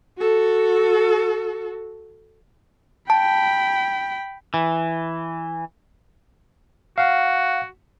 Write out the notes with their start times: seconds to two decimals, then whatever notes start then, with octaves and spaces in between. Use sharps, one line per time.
0.18 F#4 A4
3.10 G5 A5 B5
4.54 E3
6.98 F#4 F5 F#5